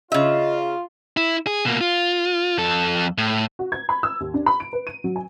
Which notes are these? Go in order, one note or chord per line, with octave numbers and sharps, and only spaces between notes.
C#3 F4 D#5 E5
E4
G#4
B2 A#3
F4
F2 A4
A2
F#4
G#6
B5
E6
D#2
D4
B5
D7
B4
D#7
F#3
G#5